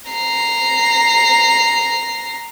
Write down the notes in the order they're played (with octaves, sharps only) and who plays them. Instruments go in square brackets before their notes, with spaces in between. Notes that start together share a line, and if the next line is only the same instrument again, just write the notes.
[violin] A#5 C7